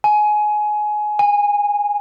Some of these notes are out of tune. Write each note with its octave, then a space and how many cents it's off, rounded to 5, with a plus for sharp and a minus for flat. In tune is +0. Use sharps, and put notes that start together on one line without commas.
G#5 +20
G#5 -20